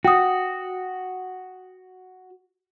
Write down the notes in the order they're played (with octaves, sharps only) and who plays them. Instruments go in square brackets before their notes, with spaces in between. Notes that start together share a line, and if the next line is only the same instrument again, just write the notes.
[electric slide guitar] F#4 [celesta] G5 D#6